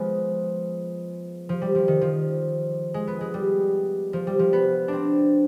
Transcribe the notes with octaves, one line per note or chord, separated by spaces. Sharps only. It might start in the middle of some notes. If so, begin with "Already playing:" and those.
Already playing: F3 G#3 B3
F3
G3
F3
D#3
F3
G#3
B3
G#3
G3
F3
G3
F3
B3
C4 D4